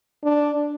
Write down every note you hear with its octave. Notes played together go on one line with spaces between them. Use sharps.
D4